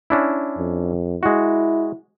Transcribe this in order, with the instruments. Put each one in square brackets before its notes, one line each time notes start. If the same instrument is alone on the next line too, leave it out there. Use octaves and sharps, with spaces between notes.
[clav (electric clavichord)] C#4 D4 E4
[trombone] F2
[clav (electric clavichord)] G#3 F#4 [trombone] E4